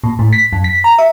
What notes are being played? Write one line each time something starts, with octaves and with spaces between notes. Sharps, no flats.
A#2
A2
B6
F#2
B6
A#5
E5